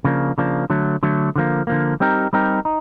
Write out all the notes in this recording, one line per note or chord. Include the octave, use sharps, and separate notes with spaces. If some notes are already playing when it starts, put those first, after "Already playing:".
C#3 F3 A#3 D4
C#3 F3 A#3 D4
D3 F#3 A3
D3 F#3 A3
D3 F3 A#3
D3 F3 A#3
G3 C4 D#4 G4 A#4
G3 C4 D#4 G4 A#4
D#4